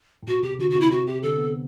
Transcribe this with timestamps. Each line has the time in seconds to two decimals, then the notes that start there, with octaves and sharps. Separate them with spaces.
0.23 A2
0.27 B2 F#4
0.43 C3 G4
0.59 D3 F#4
0.70 F#4
0.75 C3
0.81 E4
0.91 C3 F#4
1.07 C3 G4
1.23 D3 A4
1.38 B3